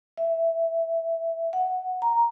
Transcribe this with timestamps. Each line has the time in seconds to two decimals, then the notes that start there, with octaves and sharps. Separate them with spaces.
0.17 E5
1.53 F#5
2.02 A#5